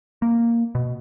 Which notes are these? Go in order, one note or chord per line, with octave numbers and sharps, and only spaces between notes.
A#3
B2